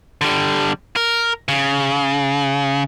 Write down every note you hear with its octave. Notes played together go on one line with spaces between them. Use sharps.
D3 G3
A#4
C#3